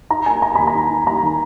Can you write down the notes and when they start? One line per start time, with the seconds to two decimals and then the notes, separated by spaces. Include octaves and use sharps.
0.10 D#4 A#5
0.26 A#3 G#5
0.42 A#3 A#5
0.55 D#2 B5
0.67 A#5
0.75 D#4
0.90 D#4
1.07 D#2 A#5
1.23 D#3